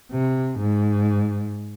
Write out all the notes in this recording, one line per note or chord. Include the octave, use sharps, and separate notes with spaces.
C3
G#2